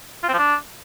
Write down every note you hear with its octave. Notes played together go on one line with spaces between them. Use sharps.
F4
C4
F3
D4